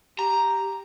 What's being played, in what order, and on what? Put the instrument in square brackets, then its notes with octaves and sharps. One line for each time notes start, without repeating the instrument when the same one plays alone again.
[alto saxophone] G4 [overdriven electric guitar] A#5